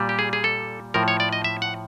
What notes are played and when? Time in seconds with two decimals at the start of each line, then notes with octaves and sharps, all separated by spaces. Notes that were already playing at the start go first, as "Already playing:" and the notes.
Already playing: A#2 G3
0.09 G4
0.19 G#4
0.33 G#4
0.44 A4
0.94 A2 F3 A#4
1.08 C#5
1.20 D5
1.33 D#5
1.44 E5
1.62 F#5